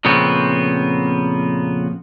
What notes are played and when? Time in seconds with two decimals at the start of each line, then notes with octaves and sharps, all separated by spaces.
0.05 F2 A#2 C#3 B3 C4